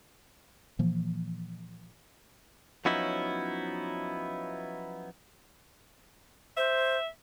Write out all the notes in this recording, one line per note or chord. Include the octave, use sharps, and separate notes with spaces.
A#2 E3 F3 A#3
F3 F#3 B3 C#4 D#4 E4
C5 E5